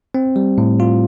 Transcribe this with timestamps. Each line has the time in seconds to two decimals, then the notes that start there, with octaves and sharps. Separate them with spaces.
0.15 C4
0.36 G3
0.58 A2
0.80 F4